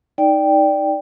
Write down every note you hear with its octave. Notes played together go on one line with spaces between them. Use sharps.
D#4 D5 G5